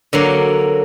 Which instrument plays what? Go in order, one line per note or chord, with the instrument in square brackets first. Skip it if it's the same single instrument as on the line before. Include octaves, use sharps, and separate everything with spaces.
[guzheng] D3 F#3 A#3